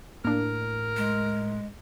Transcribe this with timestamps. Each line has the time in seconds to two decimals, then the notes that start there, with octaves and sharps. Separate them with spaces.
0.25 A2 A#3 D4 A#4
0.97 G#3